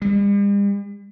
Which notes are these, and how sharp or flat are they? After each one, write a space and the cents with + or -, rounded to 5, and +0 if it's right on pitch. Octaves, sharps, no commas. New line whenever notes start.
G3 +45